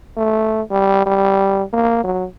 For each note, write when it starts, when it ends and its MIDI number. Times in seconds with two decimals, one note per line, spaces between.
0.17 0.62 57
0.71 1.03 55
1.06 1.63 55
1.73 2.00 58
2.04 2.25 54